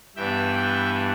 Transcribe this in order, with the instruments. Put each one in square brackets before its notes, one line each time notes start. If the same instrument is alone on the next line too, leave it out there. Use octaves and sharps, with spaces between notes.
[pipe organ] G2 E3 B3 D4 E5 G5
E5 G5